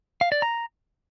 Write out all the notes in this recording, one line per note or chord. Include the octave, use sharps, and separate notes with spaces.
F5
D5
A#5